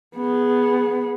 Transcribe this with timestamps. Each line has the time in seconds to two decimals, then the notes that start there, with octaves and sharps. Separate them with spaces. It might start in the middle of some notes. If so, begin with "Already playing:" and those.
0.16 B3 G#4